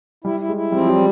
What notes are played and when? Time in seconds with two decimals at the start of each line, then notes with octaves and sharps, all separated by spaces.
0.24 G3 E4
0.40 E4
0.49 G#3
0.56 E4
0.72 G3 C4
0.80 F3
0.88 F#3 G3